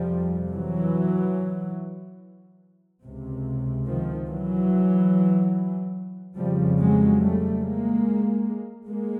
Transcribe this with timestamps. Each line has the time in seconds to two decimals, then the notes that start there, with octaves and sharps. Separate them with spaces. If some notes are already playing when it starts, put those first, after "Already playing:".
Already playing: F2 C3 F3 G3
0.52 E3 F#3
3.03 C#2 C3
3.87 D#3 F3
4.28 E3 F#3
6.37 F2 C#3 F3 G3
6.79 F#3 G#3
7.21 G3 A3
7.62 G#3 A#3
8.88 G#3 A#3